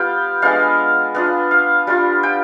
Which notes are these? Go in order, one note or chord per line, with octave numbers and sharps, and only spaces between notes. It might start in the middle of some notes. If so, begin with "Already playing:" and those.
Already playing: G3 B3 F4 F5 G5
G#3 B3 D4 F5
B3 D4 F4
F5
G3 D4 F4
G5